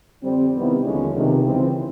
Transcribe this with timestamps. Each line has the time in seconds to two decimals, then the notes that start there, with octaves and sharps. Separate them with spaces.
0.22 F2 D3 G3 C4
0.54 C3 D#3 G3 B3 E4
0.84 D#2 D3 F3 G#3 C#4
1.14 C#2 C3 D#3
1.44 C#2 C#3 E3 G#3 C4